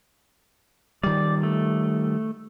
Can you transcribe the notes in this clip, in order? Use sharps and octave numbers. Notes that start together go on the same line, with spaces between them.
D#3 G3 D5
A3